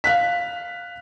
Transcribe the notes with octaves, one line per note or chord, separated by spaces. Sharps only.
F5 F#6 B6